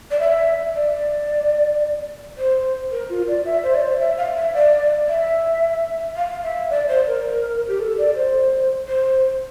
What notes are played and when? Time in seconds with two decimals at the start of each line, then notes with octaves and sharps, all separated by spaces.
0.11 D5
0.20 E5
0.74 D5
2.37 C5
2.91 A#4
3.09 F4
3.28 D5
3.45 E5
3.63 C5
3.74 D5
3.81 C5
3.99 E5
4.17 F5
4.35 E5
4.54 D5
5.07 E5
6.17 F5
6.43 E5
6.70 D5
6.88 C5
7.07 A#4
7.68 G4
7.80 A4
7.98 D5
8.15 C5
8.88 C5